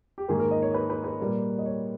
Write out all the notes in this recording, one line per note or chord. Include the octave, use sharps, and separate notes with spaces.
G4
G#2 D#3 A#3 G#4
A#4
D#5
C#5
B4
B4
B4
A#2 G3 A#3
D#5
C#5